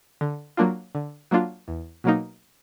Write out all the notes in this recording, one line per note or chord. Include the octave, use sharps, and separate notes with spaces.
D3
F#3 A#3 D4 F4
D3
F#3 A#3 D4 F4
E2
B2 F#3 A#3 D#4